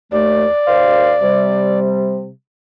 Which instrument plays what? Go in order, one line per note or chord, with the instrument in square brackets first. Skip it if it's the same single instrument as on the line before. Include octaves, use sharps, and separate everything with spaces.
[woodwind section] D#2 A3 [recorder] D5
[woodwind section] D#2 C5 F5
C3 G3